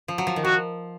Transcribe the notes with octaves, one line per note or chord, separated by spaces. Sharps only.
F3
F#3
F3
D#3
F3 F#4